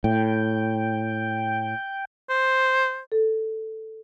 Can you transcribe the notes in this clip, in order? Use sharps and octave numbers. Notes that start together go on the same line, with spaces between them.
A2 G5
C5
A4